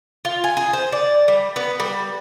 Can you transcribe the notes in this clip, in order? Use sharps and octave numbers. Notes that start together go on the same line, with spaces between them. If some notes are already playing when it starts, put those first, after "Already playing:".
F4
G#5
G#4
C5
D5
G3
B3
G3